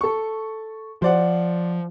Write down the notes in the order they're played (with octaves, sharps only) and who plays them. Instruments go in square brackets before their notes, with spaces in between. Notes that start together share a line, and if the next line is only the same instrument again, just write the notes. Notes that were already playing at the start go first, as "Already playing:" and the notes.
[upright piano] A4 C#6
[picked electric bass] F3 [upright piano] C5 D5 F#5